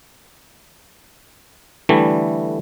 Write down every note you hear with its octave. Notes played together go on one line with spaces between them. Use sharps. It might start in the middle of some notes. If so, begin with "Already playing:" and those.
D3 E3 G3 A3